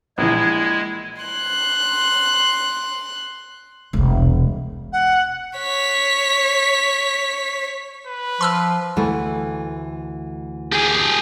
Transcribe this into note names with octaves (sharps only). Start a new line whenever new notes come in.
A#1 E3 G#3 E4 G#6
C6 F#6
E1 C2
F#5
C#5 B6
B4
F3 C6 E6 F6
D2 E3 A3
G4 G#4